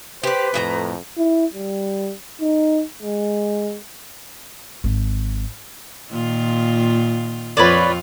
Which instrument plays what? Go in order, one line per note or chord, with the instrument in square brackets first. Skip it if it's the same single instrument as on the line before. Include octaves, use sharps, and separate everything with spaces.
[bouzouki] G4 D5 [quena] B4 [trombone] C5
[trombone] F2 [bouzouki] A2 E4 A#5
[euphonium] E4
G3
D#4
G#3
[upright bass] G#1
[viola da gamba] A#2 D#3 F4
[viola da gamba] F2 F4 [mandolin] B4 C#5 D5